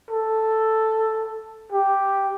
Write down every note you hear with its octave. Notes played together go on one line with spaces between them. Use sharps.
A4
G4